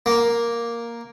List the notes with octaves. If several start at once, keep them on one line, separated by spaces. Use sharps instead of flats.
A#3